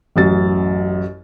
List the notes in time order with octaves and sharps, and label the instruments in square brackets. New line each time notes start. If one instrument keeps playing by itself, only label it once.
[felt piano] A1 F#2 A6